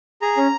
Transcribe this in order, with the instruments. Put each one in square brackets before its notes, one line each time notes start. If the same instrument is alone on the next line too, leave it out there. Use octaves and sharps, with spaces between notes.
[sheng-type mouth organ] G#4 A#5
C#4